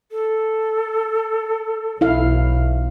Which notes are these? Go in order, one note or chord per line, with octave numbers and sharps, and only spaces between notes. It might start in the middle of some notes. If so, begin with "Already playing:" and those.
A4
B1 E4 F5